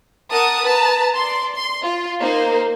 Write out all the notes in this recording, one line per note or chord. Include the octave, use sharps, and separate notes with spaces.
A#4 F#5 A5 D#6
B4 A5 A#5
D5 C6
C6
F4
A#3 D#4 C5